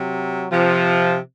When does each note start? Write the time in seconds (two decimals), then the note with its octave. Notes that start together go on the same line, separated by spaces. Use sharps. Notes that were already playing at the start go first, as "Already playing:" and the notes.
Already playing: C3 F#3
0.52 C3 F3